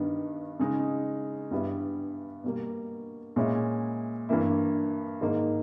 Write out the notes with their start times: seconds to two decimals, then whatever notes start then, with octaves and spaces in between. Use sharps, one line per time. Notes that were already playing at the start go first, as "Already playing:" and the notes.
Already playing: G2 D#3 G3 B3
0.60 C#3 G#3 D#4
1.51 G2 G3 B3 E4
2.44 B2 G3 A#3
3.36 A#2 G#3 C#4 E4
4.29 G2 E3 A#3 E4
5.21 G#2 D#3 A#3 D#4